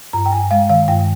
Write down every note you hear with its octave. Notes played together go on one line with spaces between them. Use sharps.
G2 A#5
G5
G2 G#5
G#3 F5
D#3 F5
G2 G5